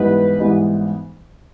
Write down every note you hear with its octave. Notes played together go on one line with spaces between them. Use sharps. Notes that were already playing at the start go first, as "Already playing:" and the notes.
Already playing: G#2 E3 G3 B3 D#4 B4
G#2 E3 G3 B3 D#4